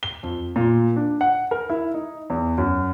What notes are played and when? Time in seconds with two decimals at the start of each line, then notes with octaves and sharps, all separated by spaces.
0.03 G7
0.23 F2
0.56 A#2
0.96 D4
1.21 F#5
1.51 A#4
1.70 E4
1.94 D#4
2.30 E2
2.58 F#2